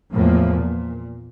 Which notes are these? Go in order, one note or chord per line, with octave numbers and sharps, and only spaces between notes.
E2 A2 F3 A#3
A#2